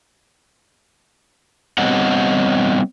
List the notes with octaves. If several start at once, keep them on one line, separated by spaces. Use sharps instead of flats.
G3 B3 C4 C#5 D#5 F#5